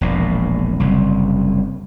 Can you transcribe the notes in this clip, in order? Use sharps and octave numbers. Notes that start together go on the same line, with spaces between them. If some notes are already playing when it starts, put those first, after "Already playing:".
E1 A#1 A#2
F#1 C2